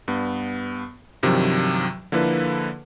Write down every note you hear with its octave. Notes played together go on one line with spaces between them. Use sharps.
G2 B3
G2 C3 D#3 F3 F#3
D3 F3 A#3 E4 A4 B4